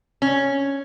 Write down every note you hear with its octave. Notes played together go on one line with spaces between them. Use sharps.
C#4